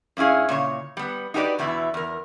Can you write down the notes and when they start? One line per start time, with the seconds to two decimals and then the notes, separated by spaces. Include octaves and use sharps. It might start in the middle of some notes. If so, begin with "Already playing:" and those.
0.17 G2 C#4 E4 G#4 F5
0.49 A#2 C#3 C#5
0.97 G3 B3
1.34 D#4 F#4 G4 B4 D5
1.59 E2 B2 E3 E4
1.94 E2 A#4